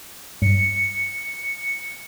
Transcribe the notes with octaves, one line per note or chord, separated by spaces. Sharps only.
G2 C#7